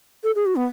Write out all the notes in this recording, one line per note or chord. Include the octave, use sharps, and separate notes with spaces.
A4
G#4
F#4
B3